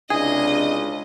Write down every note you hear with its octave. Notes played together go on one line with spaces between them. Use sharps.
C#2 C3 D4 E4 G#4 D#5